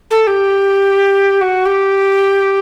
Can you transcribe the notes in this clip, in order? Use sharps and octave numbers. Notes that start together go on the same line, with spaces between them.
A4
G4
F#4
G4